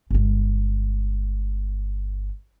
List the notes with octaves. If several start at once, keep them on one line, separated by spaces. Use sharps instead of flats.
G1 G#3